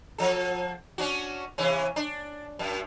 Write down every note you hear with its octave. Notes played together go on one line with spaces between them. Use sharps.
F3 A4
C#4 D4 F#4
C3 E3 C#4
D4
F#2